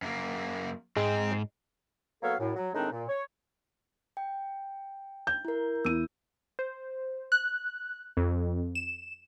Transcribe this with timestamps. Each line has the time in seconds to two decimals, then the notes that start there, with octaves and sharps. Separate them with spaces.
0.02 F#2 A#3
0.97 G#2 G#3 C4
2.22 F#3 A#3 B3 A4 C#5 F5
2.39 F#2 A2
2.56 F#3
2.74 A2 D#3 G#3 C4 D4 D#4
2.92 A#2
3.09 C#5
4.17 G5
5.27 G6
5.45 E4 A#4
5.85 E2 E4 E6 D#7
6.59 C5
7.32 F#6
8.17 F2
8.75 E7